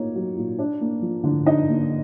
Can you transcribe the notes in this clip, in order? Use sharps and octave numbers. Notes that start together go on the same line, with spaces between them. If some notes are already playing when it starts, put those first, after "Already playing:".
Already playing: A#2 A#3 D#4 C#5
F#3
A#2
D4
A#3
F3
D3
D4 D#4 D#5
A#3